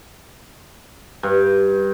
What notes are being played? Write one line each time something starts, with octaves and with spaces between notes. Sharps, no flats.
G2